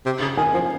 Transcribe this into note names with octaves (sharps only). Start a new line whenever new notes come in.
C3
C#3
D#3 G#5
F3